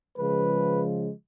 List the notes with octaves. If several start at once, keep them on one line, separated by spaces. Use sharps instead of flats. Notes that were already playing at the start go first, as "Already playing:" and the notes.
C#3 F3 G#3 B4